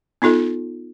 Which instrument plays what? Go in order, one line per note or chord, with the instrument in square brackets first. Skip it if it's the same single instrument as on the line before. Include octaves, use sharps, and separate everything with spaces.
[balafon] B3 D#4 F4 A4